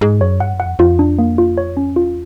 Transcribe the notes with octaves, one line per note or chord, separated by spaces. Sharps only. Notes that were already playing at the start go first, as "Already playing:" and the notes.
G#2 G#4
F#2 C#5
G2 F#5
F#2
F#5
F2
F2 F4
D4
A#3
F4
C#5
C#4
E2 F4